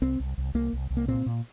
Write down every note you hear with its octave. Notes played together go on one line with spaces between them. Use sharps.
C2 C4
C2
C2
C2 A#3
C2
C2
A#3
A#2 C4
A#2